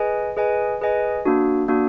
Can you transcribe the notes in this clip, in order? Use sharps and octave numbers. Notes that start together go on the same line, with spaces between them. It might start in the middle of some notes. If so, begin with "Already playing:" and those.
Already playing: G#4 B4 D#5 G#5
G#4 B4 D#5 G#5
G#4 B4 D#5 G#5
A#3 D4 F#4
A#3 D4 F#4